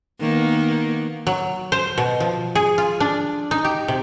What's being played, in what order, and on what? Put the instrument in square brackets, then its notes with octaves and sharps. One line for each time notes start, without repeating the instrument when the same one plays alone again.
[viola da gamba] D#3 A#3 B3
[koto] F#3
C5
B2
F3
G#4
F4
D4
D#4
G4
C3